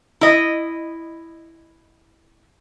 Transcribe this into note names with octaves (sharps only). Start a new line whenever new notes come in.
E4 D#5